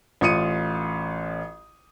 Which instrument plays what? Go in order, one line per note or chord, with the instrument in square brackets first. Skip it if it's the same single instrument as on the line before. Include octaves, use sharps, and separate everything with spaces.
[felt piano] A1 F4 D#6 C#7 D#7